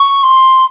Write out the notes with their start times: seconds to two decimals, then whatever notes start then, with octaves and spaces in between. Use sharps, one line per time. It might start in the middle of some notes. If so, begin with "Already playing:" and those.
Already playing: C#6
0.23 C6